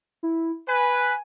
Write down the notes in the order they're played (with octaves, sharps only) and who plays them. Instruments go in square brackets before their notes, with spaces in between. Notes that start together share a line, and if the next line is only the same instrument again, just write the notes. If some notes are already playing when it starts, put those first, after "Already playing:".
[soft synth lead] E4
[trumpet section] B4 [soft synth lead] G#5